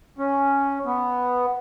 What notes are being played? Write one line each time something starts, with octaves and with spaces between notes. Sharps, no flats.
C#4
B3